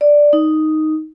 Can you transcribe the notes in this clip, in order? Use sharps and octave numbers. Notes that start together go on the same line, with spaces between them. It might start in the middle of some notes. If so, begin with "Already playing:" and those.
D5
D#4